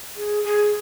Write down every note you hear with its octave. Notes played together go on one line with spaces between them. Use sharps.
G#4
G#4